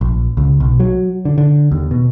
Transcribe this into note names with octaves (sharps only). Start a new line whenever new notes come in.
A#1
C#2
B1
F#3
D3
D3
D#2
B2